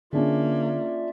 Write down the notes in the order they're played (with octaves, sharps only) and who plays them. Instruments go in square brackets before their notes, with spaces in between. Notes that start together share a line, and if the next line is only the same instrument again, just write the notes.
[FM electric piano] D3 [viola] A#3 [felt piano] C#4 D4 G#4 [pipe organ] F4 D5 E5